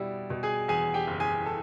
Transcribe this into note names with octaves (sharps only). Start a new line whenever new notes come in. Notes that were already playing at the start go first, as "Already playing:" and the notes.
Already playing: B2 G3 E4
B2
G#4 G#5
E2 G#4 G#5
G4 G5
F#1
G#4 G#5
A4 A5